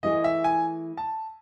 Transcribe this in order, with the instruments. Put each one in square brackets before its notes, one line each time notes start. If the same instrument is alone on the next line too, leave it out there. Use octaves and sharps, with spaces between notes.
[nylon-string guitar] E3 A3 E4 G#4 [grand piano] D#5
[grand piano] E5
G#5
A5